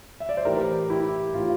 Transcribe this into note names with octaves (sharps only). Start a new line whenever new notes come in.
E5
D5
C5
A2 E3 G4 A#4
E4 G4
A2 E3 F4